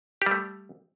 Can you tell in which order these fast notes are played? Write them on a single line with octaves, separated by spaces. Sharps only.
G4 G3 A3